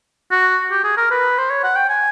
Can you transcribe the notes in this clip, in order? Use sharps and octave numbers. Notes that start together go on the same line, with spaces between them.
F#4
G4
G#4
A#4
B4
C5
C#5
F#5
G5
G#5